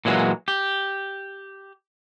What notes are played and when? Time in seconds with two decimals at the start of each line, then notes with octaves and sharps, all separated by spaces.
0.05 A#2 E3 F#3 G#3
0.48 G4